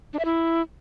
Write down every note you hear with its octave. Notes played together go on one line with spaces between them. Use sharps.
D4
E5
E4